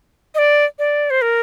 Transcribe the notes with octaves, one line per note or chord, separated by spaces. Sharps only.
D#5
D5
D5
C5
A#4